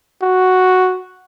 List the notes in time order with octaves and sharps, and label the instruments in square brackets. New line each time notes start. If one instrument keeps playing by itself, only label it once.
[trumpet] F#4